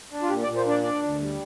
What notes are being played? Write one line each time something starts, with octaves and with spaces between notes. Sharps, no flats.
D4
F4
A#2 G4
D5
A#2
C5
D4 D5
D4 D5
D2
G3